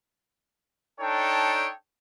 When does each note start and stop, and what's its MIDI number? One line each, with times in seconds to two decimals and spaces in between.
1.00 1.68 62
1.00 1.68 63
1.00 1.68 69
1.00 1.68 73
1.00 1.68 79